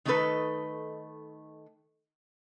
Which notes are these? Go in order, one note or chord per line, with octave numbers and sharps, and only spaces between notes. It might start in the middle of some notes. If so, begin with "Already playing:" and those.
D#3 A3 D4 D#4 A4 B4